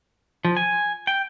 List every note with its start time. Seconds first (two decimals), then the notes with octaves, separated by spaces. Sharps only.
0.45 F3
0.57 G#5
1.07 G5